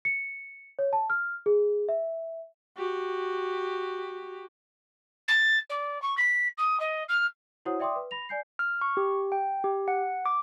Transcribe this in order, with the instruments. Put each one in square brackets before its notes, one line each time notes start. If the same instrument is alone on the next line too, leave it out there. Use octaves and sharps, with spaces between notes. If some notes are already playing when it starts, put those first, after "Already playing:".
[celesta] C#7
C#5
A5
F6
G#4
E5
[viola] F#4 G4
[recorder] A6
D5
C#6
B6
D#6
D#5
F6
[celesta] E4 F#4 C5 C#5 F#5 D#6
D5 E5 G5 C6 D6 D#6
B4
B5 A#6 F7
D5 G#5 G6 C7
[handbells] F6
C#6
G4
G5
G4
F#5
D6